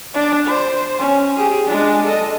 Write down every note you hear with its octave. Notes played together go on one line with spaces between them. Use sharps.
D4 D5
C5
C#4
G4 G#4
G#3 D4
A4 D#5